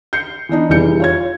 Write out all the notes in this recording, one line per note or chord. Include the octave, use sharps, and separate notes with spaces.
G6 C7 C#7
E3 B3 D4 D#4
F1 E3 G3 G#4 G6 C#7
F4 C#5 G#6